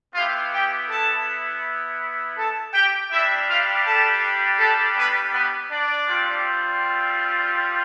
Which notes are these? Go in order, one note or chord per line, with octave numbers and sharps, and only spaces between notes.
B3 E4 F4 G4 F5
G4 G5
A4 A5
A4 A5
G4 G5
G3 D4 E4 G4 E5
F4 F5
A4 A5
A4 A5
B3 B4
B3 B4
D4 D5
G3 C4 F4